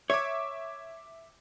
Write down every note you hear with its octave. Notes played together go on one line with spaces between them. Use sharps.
C#5 E5 D6